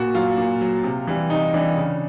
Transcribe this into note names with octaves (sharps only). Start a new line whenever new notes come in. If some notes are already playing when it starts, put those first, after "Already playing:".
Already playing: A#2 F#4
F#3 F4
A#2
F#3
C3
E3 G3
C3 D#4
E3 G3 D4
C#3